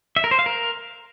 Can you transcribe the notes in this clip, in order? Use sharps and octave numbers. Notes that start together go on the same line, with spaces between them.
E5
A#4
C5
F5
A#4